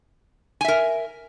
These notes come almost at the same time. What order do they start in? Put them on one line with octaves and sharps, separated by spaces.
G#5 E5 A#4